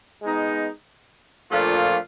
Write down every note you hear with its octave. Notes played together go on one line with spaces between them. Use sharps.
G#3 B3 D#4
A#2 F3 A3 D4 F4